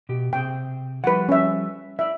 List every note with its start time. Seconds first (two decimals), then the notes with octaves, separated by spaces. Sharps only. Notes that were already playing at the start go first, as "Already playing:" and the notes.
0.09 B2 G4
0.33 C3 C4 G#4 G5
1.04 F3 G3 B4 F#5
1.29 C#4 E5
1.99 E4 D5 E5